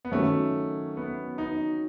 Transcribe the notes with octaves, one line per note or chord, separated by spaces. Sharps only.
B3
D#3 F#3 A3 C#4
B3
D#4